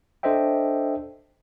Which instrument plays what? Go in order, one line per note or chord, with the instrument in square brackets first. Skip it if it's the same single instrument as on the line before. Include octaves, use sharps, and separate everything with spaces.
[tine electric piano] D4 A4 C5 D#5 E5 G5